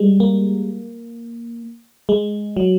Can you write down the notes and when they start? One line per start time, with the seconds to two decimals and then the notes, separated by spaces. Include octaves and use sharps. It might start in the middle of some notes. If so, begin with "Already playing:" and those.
Already playing: G3 G#3
0.20 A#3
2.09 G#3
2.57 F#3